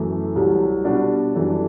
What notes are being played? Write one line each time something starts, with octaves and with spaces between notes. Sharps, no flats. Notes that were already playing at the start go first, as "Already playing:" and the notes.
Already playing: F#2 E3 A3
C2 C3 F#3
B2 G3 D4 F#4
F#2 E3 G3 D4 A4